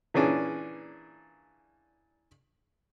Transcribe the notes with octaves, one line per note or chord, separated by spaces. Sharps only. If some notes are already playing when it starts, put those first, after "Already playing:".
A#2 E3 C#4 D4 G#4